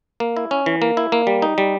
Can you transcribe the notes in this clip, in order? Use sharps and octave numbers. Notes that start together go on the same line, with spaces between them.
A#3
E4
C#4
E3
A#3
E4
A#3
G3
D#4
G3